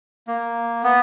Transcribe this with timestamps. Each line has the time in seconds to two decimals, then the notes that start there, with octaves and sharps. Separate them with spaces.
0.28 A#3
0.84 B3